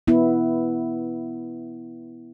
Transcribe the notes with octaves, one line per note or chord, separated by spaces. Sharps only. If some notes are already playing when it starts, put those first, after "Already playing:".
B3 E4